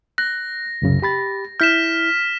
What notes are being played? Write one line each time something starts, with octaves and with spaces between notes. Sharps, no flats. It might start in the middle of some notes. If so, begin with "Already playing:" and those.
F#6 A#6
C2 F#2 C#3
G4 B5 A6
E4 F6 G6 B6 E7